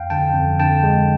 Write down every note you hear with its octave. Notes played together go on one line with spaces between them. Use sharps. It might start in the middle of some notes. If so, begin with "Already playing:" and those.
Already playing: F2 F5 G5
D3 G5 A5
F2
D3 G5 A5
G#3